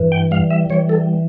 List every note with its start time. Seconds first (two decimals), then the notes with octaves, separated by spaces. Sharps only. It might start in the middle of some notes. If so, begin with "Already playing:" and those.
Already playing: G2 E3
0.12 G5
0.31 G3 F5
0.50 E5
0.70 E3 C#5
0.89 A4